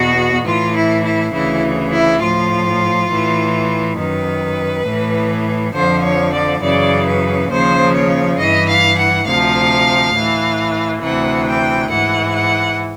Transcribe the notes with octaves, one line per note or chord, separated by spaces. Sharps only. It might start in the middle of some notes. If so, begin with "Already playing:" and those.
Already playing: E2 B2 F#4
A2 E3 F4
E4
E4
D2 C#3 E3 E4
E4
A2 F3 F4
A2 E3
F#2 D#3 B4
A2 E3
F2 D3 F3 C5
C#5
D5
F#2 C#3 E3 D5
B4
D#2 C#3 F3 C5
C#5
G2 E3 D#5
F5
F#5
D2 C3 F3 F5
A2 E3
D2 C3 E3 F#5
G5
G#2 E3 F#5
F#5